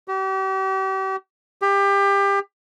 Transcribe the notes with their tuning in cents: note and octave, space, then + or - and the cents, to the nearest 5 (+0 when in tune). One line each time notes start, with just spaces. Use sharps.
G4 -40
G4 +25